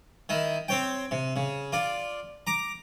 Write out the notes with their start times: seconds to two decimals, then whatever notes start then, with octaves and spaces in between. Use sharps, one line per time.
0.29 D#3 E4
0.68 C4 C#5 G5
1.11 C3
1.36 C#3
1.73 F4 D5
2.47 A#5 D6